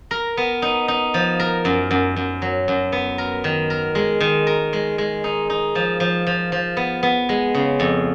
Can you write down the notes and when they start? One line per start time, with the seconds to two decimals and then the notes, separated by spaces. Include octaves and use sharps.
0.11 A#4
0.37 B3
0.62 D#4
0.88 D#4
1.14 F3
1.40 A#4
1.65 F#2
1.91 F#2
2.16 F#2
2.42 F#3
2.68 F#2
2.92 B3
3.18 A#4
3.44 D#3
3.70 A#4
3.95 G#3
4.20 D#3
4.47 A#4
4.73 G#3
4.98 G#3
5.24 D#4
5.50 D#4
5.75 F3
6.00 F3
6.27 F3
6.52 F3
6.77 B3
7.03 B3
7.29 G#3
7.54 C#3
7.80 F2